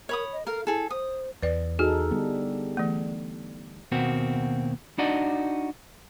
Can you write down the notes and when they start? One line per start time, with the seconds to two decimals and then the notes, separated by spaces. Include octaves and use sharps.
0.09 A#4 C#5 B5 D#6
0.33 D#5
0.47 A4 A#4 F5
0.67 E4 G#4 A4
0.90 C5 D#6
1.43 E2 B4 D5
1.79 D#4 F#4 G#4 A4 F6
2.11 D3 G3 B3
2.77 E3 A3
3.92 D#2 B2 A#3 C4 F#4
4.98 D4 D#4 F#4 D5 D#5